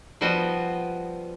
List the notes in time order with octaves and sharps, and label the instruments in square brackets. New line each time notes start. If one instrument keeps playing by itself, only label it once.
[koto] F3 G3 B3 F#4 D#5